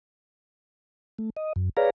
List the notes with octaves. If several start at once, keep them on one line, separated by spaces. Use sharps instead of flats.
A3
D#5
F#2
G#4 B4 C#5 D5 F5 A#5